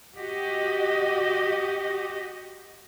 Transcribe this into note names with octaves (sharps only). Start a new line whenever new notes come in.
F#4 G4 D#5